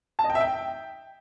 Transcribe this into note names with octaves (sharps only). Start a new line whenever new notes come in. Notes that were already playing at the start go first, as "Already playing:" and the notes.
A5
D#5
G5
E5
G5